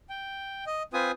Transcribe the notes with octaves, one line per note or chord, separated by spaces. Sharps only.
G5
D#5
C4 F4 B4 G#5 D#6